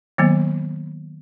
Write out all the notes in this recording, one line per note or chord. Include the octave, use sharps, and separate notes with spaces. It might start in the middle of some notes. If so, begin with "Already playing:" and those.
D#3 F#3 A#3 B3